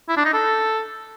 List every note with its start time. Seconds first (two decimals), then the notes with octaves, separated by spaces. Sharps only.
0.09 E4
0.17 D4
0.25 D#4
0.33 A4